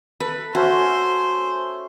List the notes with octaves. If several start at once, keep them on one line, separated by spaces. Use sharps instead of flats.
A4 B4
A3 C#4 F#4 C5 C6